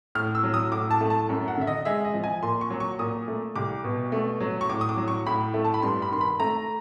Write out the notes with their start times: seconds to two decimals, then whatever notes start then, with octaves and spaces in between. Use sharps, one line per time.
0.15 A2 F6
0.35 E6
0.44 F#3
0.54 D#6
0.72 A2 D6
0.91 A5
1.01 A3
1.10 A5
1.29 F#2
1.48 F#5
1.57 D3 E5
1.67 D#5
1.85 G#3 E5
2.05 D#5
2.14 F3
2.24 G#5
2.43 A#2 C6
2.61 C#6
2.70 F#3
2.80 C#6
2.99 A#2 D#6
3.28 A3
3.56 C2 D6
3.84 B2
4.12 A3
4.40 F#3
4.61 C#6
4.69 A2 D6
4.81 D#6
4.89 D6
4.97 F#3
5.08 C#6
5.26 A2 B5
5.54 A3
5.64 A5
5.74 B5
5.82 G2 C6
6.02 B5
6.12 D#3 C6
6.21 B5
6.40 A3 A#5